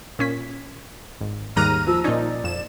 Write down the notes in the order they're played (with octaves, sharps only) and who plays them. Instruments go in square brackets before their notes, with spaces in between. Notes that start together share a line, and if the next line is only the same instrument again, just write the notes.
[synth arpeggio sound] A#2 C#4 B6
[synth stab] G#1
[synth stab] D#2 A#5 D#7 [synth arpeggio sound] G#2 G3 F#6 [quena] F6
[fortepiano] F3 [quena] E6
[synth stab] A#2 D#4 [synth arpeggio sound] C#4 [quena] D5
[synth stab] F2 E7